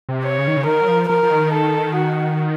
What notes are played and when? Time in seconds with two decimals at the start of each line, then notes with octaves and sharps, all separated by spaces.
0.09 C3
0.24 C#5
0.38 C#3
0.47 D#3
0.57 C#3
0.66 D#3 A#4
0.81 F#3
0.88 F3
1.09 F3 A#4
1.23 F3
1.31 D#3
1.53 A4
1.95 F#4